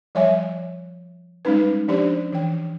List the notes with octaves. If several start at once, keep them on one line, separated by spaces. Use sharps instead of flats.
F3 G3 C#5 E5 G#5
G3 G#3 C#4 D#4 B4
F3 C#4 D4 G4 C5 D5
E3 G5